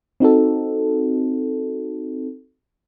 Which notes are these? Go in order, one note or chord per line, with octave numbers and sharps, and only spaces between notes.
C4 D#4 F#4 A4